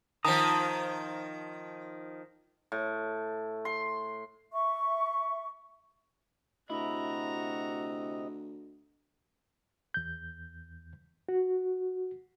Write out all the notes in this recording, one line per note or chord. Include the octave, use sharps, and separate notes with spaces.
D#3 F3 A5 A#5 D#6
A2
C6
E5 C#6
D2 C3 E4 F#4 D#5 A#5
E2 G6
F#4